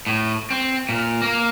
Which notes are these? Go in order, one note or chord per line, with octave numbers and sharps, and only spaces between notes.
A2
C4
A#2
A#3